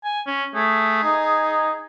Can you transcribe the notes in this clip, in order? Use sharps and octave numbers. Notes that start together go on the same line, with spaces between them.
G#5
C#4
A3 G#4
D#4